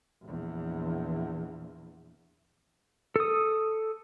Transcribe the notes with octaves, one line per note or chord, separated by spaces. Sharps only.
A#1 E2
A4 D#6